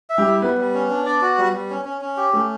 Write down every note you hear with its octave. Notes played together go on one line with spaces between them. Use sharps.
E5
G3 G4
E4
G3 B3 B4
G3
C#4
D4
D5
F#4
G3
G3
C#4
C#4
C#4
G4
A3 C#4 A4